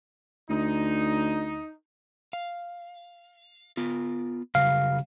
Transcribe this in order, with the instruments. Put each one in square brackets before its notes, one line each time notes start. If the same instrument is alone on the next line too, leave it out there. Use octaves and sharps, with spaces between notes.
[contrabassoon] D2 [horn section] D#4
[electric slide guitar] F5
B3 F4
[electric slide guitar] C#3 F#3 G3 [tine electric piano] F5